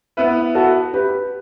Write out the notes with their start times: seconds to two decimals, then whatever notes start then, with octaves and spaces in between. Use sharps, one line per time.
0.17 B3 E4 B4
0.55 F#4 A4
0.93 G4 B4